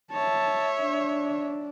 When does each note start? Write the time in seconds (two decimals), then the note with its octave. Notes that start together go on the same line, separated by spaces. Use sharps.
0.13 C#5 E5 A5
0.81 D4